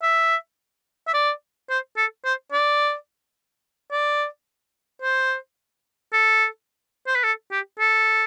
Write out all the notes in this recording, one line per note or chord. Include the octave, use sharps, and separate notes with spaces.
E5
E5
D5
C5
A4
C5
D5
D5
C5
A4
C5
B4
A4
G4
A4